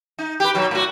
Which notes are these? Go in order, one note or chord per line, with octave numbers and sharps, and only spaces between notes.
D#4
G4 B4
B2 F#3
A2 F#4